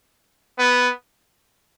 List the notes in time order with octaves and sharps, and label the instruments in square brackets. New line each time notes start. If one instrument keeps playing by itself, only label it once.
[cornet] B3